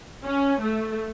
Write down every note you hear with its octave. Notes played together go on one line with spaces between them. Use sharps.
C#4
A3